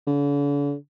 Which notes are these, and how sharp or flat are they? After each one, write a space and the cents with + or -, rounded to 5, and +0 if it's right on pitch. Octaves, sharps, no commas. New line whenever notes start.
D3 -45